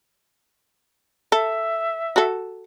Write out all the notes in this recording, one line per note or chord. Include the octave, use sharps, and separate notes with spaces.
A4 E5
F#4 A4